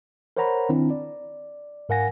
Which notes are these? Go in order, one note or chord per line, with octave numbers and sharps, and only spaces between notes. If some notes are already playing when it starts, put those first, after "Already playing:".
A#4 C5 C#5 F#5 A#5 B5
D#3 C4 D4 E4
D5
G#2 A#4 F5 F#5 G#5 A#6